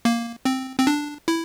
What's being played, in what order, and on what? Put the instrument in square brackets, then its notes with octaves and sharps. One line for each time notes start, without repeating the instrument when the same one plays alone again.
[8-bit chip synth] A#3
C4
C4
D4
E4